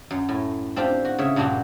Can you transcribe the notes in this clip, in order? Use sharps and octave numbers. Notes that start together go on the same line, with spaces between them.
F#2
A2
C4 D4 F4 G4
F#4
C#3 C#5 E5
G2 A#2 A#3 D4 F#4 G4